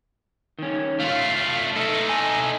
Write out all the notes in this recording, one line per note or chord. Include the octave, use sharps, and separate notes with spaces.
D#3 C#4
A3 F4 F5
A3 D#4 A4
A3 G#5